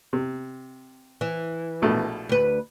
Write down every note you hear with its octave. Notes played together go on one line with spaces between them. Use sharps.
C3
E3
A#1 B2 A3
D2 B4